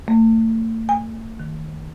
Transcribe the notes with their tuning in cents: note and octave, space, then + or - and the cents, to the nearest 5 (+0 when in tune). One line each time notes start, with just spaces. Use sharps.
A3 +35
G#5 -25
D#3 +0